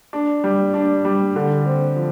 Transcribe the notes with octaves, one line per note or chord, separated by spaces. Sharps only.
D4
G3
D4
G3
D3
C4
F3